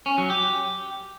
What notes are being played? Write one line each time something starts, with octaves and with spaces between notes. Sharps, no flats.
C#4
F#3
G4